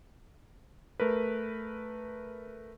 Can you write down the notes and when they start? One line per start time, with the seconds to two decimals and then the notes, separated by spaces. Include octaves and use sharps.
1.00 A3 A#4 B4